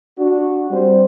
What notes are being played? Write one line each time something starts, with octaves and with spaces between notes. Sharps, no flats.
D4 F#4
G3 C4 C5